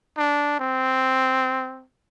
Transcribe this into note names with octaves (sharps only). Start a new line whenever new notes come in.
D4
C4